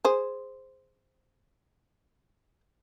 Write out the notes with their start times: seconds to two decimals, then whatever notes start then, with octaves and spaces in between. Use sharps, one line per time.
0.04 G#4 C5